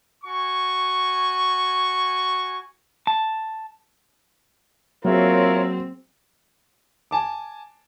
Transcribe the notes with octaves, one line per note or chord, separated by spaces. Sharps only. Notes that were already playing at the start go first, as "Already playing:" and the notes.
F#4 G#5 C#6
A5
F#3 A#3 C4 F4 G#4 A#4 C#5 E5
G#5 A5 D6